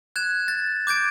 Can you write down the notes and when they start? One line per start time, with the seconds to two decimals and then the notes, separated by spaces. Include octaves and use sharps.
0.16 F#6 G#6 E7
0.48 A6
0.87 D6 G6 G#6 D7